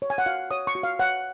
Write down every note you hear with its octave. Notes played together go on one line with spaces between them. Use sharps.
C#5
G#5
F#5
F#4 F5
C#5 D#6
C#6
F#4
F5
C#5 F#5